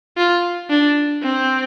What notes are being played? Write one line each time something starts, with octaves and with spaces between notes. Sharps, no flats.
F4
D4
C4